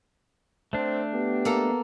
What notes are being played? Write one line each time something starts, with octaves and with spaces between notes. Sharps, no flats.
A3 C4 D4
B3 G4
A#3 A4 A#5